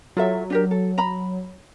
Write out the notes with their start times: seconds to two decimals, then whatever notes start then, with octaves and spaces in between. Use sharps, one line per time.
0.17 F#3 F4 A4 E5
0.50 D4 G4 A#4
0.71 A4
0.98 A#5 B5